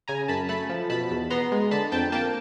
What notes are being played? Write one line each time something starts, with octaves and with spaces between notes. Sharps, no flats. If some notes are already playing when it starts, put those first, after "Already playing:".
C#3 G#5 A#5
F#2 A5 B5
A3 A5 B5
F3
B2 A5 B5
E2
B3 A#5 C6
G#3
D3 A5 B5
F2 G5 A5
A#3 G5 A5